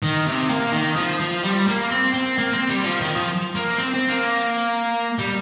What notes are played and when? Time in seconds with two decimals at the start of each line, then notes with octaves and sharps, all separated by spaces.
0.03 D#3
0.26 C3
0.49 A#3
0.73 D#3
0.96 F3
1.20 F3
1.44 G3
1.68 A#3
1.91 C4
2.14 C4
2.38 A#3
2.53 C4
2.69 G3
2.84 F3
3.01 D#3
3.16 F3
3.55 A#3
3.78 C4
3.94 C4
4.09 A#3
5.19 G3